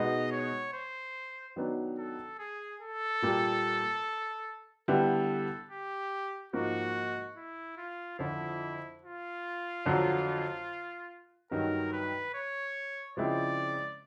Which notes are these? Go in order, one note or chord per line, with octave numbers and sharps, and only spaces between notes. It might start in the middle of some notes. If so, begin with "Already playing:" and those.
Already playing: B2 G#3 B3 D#4 D#5
C#5
C5
D#3 F#3 B3 D4
A4
G#4
A4
A#2 G3 A#3
D3 G3 B3 E4 A4
G4
G#2 F3 A#3 F#4
E4
F4
F2 D3 F3 E4
F4
F2 D3 F#3
G2 D#3 F#3 A#4
B4
C#5
C#3 F3 G#3 C4 E4 D5